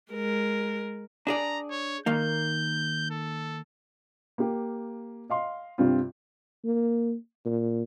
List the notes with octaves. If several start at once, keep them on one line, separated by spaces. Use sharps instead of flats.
G#3 A#4
D4 G#4 D5 A#5
C#5
D#3 A#3 D#4 G6
A4
A#3 G4
D#5 F5 C6
G2 C3 C4 F4
A#3
A#2